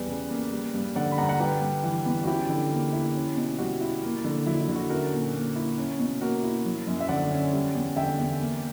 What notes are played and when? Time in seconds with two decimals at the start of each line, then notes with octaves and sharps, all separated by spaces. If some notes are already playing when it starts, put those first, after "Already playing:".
Already playing: E2 G3 B4 D5
0.09 C#3
0.30 A#3
0.53 G3
0.74 G2
0.95 D3 D5 F#5
1.12 B5
1.18 G2 F#5 A#5
1.29 F#5 A#5
1.40 G3 G4 B4
1.61 G2
1.83 E3
2.05 B3
2.23 F#4
2.27 C#4 E4 G4
2.49 D3
2.71 A#3
2.93 E4
3.15 C#4
3.37 B2
3.58 G3 F#4
3.81 E4
4.03 A#3
4.24 D3
4.46 F#3 E4
4.61 E4
4.68 D3
4.75 F#4
4.90 C#4 F#4 A#4
5.12 A#2
5.34 A#3
5.56 E4
5.78 C#4
5.99 B2
6.21 A#3 F#4 A#4
6.43 E4
6.65 F#3
6.87 F#2
7.00 E5
7.09 D3 D5 F#5
7.31 C#4
7.53 G3
7.75 E2
7.96 D3 E5 G5
8.18 E2
8.40 A#3